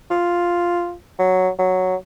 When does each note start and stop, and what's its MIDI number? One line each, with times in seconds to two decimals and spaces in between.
0.11 0.94 65
1.19 1.49 54
1.59 1.96 54